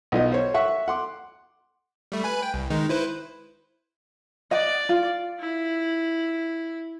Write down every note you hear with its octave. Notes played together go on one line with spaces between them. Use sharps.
B1 F4 D#5
C5 C#5
E5 F#5 C#6
F#5 C6 D6
G3 A3
B4 G#5 B5
G5
C2
D#3 G#3 D#4
E4 B4 C5
D5 D#5 F#5
F4
E4